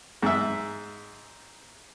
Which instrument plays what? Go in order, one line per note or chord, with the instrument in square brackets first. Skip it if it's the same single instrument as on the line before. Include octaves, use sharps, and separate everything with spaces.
[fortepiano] G#2 E5